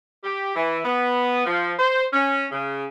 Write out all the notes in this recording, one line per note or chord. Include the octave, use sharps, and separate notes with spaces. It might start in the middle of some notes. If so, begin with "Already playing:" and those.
G4
E3
B3
F3
C5
C#4
C#3